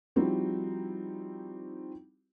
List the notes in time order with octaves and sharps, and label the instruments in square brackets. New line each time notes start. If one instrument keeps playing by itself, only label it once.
[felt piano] F3 G3 C4 D#4 E4 F#4